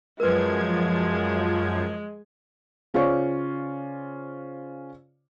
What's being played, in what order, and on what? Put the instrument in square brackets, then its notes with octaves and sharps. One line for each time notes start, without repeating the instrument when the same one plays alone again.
[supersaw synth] F#2 F3 G#6 [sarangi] G#3 [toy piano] A#4 B4
[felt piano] C#3 C#4 F4 C5 D5 C#6